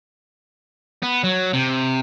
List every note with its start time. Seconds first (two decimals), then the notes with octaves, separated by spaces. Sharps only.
1.03 B3
1.24 F#3
1.53 C3